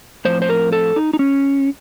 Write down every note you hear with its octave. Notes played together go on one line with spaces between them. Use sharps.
A2 F3 C4 C5
C5
A#4
A4
D#4
D#4
C#4